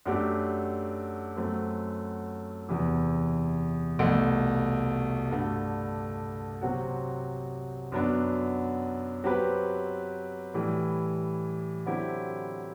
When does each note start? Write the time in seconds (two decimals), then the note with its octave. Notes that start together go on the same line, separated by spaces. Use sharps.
0.06 F#2 F#3 A3 D4 G4
1.37 F#2 F#3 A3 C4
2.69 E2 C3 E3
3.99 C2 B2 A3
5.31 G2 D3 A3
6.61 C3 F#3 C4 F#4
7.92 F#2 F#3 B3 D4
9.24 F#3 C4 G4 B4
10.54 A2 E3 G3
11.85 D3 F#3 C4 E4 G4